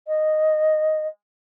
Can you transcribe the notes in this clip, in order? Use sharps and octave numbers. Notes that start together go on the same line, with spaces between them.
D#5